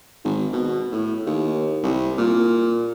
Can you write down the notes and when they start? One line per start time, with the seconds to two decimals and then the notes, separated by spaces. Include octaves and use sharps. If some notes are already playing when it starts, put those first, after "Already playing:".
0.25 G#1
0.53 B2
0.92 A2
1.26 D#2
1.83 C2
2.18 A#2